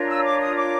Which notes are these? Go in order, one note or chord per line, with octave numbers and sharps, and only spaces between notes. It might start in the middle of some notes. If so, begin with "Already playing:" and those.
Already playing: D4 F4 A#4 C#5
E6
D6
D#6
D6